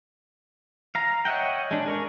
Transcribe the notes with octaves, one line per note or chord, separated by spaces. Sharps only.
F5 A#5
C#5 D#5 E5 F#5 G5
G#3 D4
G#4 A#4 C#6